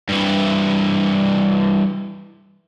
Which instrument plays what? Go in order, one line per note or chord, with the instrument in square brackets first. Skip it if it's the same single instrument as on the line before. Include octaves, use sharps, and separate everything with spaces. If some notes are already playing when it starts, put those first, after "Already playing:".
[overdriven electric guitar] G2 E3